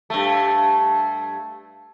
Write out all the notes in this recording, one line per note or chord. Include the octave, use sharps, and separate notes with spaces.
G2 A3